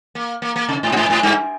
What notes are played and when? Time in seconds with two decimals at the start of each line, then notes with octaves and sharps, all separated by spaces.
0.15 A#3
0.42 A#3
0.56 A#3
0.69 C3
0.83 G#2
0.92 A#2
0.96 G#2
1.10 G#2
1.23 G2